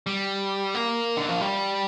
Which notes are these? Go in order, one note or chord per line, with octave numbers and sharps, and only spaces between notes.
G3
A#3
D3
F3
G3